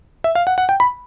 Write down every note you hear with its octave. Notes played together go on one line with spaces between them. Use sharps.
E5
F5
F#5
F#5
G5
B5